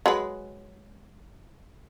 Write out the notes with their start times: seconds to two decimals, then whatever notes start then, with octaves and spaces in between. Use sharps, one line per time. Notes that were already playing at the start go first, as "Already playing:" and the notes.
0.06 F#3 G#3 B4